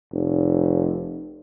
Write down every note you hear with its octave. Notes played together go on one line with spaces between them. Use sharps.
F1